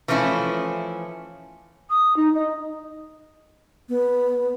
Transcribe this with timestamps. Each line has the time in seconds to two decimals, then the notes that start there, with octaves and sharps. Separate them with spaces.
0.08 E3 F3 A3 C#4 E4
1.90 D#6
2.16 D#4
2.35 D#5
3.89 B3